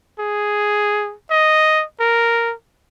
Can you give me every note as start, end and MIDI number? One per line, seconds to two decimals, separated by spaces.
0.19 1.14 68
1.30 1.84 75
2.00 2.54 70